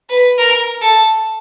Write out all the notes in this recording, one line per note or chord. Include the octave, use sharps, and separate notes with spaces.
B4
A#4
A4